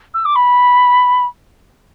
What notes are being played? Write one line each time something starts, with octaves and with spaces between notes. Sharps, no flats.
E6
D6
B5